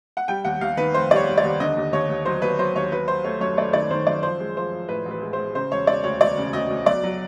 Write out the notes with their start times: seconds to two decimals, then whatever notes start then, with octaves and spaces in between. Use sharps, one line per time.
0.17 F#5
0.28 G3 G5
0.45 D#2 F#5
0.61 D#2 F5
0.77 D#3 B4
0.94 F1 C5
1.11 G3 D5
1.16 C#5
1.28 G3
1.38 D5
1.44 D#2
1.60 D3 D#5
1.76 D#2
1.92 D#2 C#5
2.09 D#2
2.25 F#3 C5
2.42 D#2 B4
2.59 F#3 C5
2.76 D#2 C#5
2.91 F#3 B4
3.08 F#3 C5
3.24 A3 C#5
3.40 F#2 C#5
3.57 A3 D5
3.73 D#3 D5
3.91 D#3 C5
4.07 F#2 D5
4.23 F3 C5
4.40 G#3
4.57 F3 C5
4.72 F3
4.89 A2 B4
5.05 A1
5.11 B4
5.22 G#3
5.33 G#3 C5
5.55 C#3 C5
5.72 E1 C#5
5.87 E1 D5
6.04 D2 C#5
6.21 E1 D5
6.38 C#3
6.53 D2 D#5
6.70 D2
6.86 B1 D5
7.03 F#3